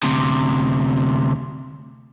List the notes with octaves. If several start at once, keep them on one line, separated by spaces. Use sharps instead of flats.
D2 C3